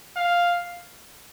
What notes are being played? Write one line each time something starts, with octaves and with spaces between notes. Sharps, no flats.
F5